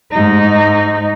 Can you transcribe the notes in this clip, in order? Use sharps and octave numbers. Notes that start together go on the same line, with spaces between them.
G#2 D#4